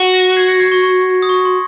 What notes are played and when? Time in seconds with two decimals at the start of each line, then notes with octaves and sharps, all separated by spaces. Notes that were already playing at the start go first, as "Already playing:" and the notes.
Already playing: F#4
0.14 A#6 C#7
0.37 G#6 C7
0.48 A#6 C#7
0.60 G#6 C7
0.72 C#6
0.83 C#6
1.22 D#6
1.29 C#6
1.45 C6